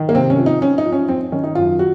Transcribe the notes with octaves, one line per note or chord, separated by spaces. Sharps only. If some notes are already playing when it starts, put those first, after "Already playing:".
Already playing: D#3
A#3
C3 C4
C#4
F3
D#4
F3 C#4
D#4
F3
C#4
F2 C4
D#3 C#4
D#4
F#2 F4
F#4